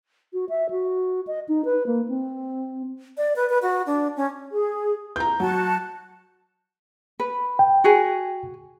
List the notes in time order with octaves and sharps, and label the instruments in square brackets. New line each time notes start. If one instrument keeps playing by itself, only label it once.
[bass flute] F#4
E5
F#4
D#5
D#4
B4
A#3
C4
[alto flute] D5
B4
B4
F#4
D4
C#4
[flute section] G#4
[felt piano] A#5 G6
[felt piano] F#3 [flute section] F#4 A5
[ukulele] B4
[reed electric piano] G5
[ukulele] F#4 G#4 G#5